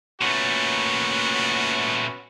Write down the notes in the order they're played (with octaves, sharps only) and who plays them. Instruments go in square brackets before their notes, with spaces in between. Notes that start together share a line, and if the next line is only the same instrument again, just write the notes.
[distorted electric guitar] A#2 A3 [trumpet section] B3 C#4 F#4